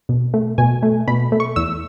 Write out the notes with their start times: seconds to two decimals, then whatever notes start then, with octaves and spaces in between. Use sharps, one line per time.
0.09 B2
0.34 A3
0.58 B2 G#5
0.83 A3
1.08 B2 B5
1.32 A3
1.40 C#6
1.56 E2 E6